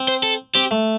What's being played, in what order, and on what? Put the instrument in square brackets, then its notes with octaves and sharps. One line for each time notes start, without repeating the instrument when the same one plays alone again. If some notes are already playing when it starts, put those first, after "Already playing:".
Already playing: [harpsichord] C4
[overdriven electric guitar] C5
A4
[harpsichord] C4 [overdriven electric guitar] G4
[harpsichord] A3